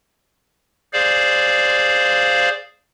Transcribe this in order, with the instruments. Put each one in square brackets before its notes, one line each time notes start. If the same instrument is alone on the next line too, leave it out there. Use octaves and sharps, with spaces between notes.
[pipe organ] G#4 C5 D5 F5